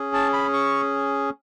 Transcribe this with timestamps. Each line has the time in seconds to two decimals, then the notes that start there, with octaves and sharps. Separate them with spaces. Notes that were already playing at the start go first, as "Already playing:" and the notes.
Already playing: C#4 G#4
0.14 A5
0.33 B5
0.53 C#6